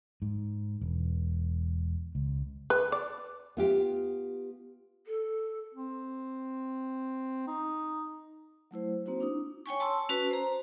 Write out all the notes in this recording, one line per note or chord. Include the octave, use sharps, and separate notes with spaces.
G#2
E1
C#2
B4
D5
B3 F4 G4
A4
C4
D#4
F#3 A3 E4 C5
A#3 C4 D#4 F#4 C5
D4 E4 D#6
C#5 G5 G#5 C#6
A5 C6 E6
C#4 F#4 B4
C5 A#5